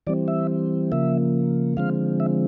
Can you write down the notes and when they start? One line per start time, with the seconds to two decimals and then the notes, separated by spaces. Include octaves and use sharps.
0.07 E3 G3 C4 D5
0.28 E5
0.92 C#3 F3 A#3 E5
1.77 D3 F3 G#3 C4 F5
2.20 E5